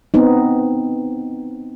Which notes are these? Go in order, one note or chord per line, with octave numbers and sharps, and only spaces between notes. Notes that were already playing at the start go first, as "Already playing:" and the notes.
B3 C4 D#4